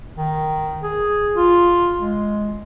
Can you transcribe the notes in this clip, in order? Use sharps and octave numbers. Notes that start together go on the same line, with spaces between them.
D#3
G#4
F4
G#3